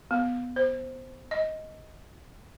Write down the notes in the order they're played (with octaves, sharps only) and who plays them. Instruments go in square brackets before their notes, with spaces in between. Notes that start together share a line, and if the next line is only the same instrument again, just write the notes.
[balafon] B3
C5
D#5